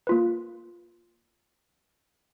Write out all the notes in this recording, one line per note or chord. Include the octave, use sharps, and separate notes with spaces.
A#3 F4 B4